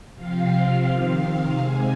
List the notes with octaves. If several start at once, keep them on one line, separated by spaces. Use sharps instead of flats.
C3 F3 C4 F5
C3 D#3 C4
C3 G#3 C4 G#5